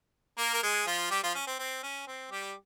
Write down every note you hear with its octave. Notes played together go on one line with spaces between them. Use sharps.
A#3 A#4
A#4
G#3 G#4
F3 F4
G3 G4
F3 F4
C#4
C4
C4
C#4
C4
G3 G4